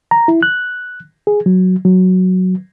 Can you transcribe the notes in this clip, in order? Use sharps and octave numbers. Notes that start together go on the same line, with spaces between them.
A#5
E4
F#6
G#4
F#3
F#3